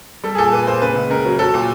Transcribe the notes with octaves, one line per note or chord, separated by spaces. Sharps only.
G3 A4
G#4
A#2 A4
A#2 B4
A#3 C5
C#3 B4
C#2
C#2 A#4
F#3
F#3 A4
A#2